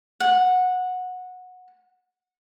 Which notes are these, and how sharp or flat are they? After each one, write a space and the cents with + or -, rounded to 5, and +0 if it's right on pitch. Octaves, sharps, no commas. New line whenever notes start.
F#5 -15